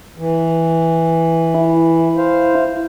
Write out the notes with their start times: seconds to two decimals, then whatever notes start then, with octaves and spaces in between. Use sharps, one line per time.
0.17 E3
1.55 E4
2.17 C5 F5